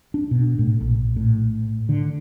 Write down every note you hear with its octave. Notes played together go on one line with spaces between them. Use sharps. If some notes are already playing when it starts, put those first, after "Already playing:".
D4
B2
A2
A#1
A2
D3